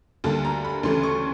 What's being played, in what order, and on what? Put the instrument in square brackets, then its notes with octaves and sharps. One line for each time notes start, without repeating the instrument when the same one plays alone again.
[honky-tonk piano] D2 D3 G3 A#3 A5
A#5
B5
D2 C#3 E3 A3 C6
C#6